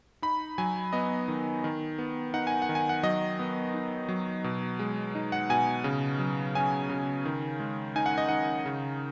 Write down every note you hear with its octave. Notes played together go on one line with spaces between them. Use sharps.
D#4 B5
F#3 G#5
B3 D#5
D#3
D#3
B3
D#4 F#5
G#5
F#5
D#3
G#5
F#5
F#3 D#5
B3
D#4
F#3
B2
G#3
D#4
F#5
B2 G#5
C#3
F#3
C#4 G#5
C#3
D#3
G#3
D#4 G#5
F#5
D#5
D#3 F#5
C#3